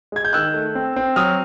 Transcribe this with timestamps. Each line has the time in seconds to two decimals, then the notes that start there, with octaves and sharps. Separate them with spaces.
0.12 G#3 G#6
0.25 G6
0.33 D#3 E6 F#6
0.54 A3
0.75 C4
0.96 C4
1.16 F#3 D#6 F6